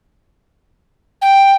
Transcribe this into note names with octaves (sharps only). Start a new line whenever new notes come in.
G5